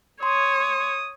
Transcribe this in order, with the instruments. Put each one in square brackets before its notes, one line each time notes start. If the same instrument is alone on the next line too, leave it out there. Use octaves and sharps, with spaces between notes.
[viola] C#5 [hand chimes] C6 [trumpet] D#6